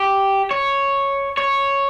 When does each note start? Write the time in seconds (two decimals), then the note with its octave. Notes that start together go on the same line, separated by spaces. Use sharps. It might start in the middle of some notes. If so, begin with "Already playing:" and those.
Already playing: G4
0.51 C#5
1.37 C#5